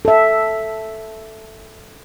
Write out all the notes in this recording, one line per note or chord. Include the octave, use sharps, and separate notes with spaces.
A4 E5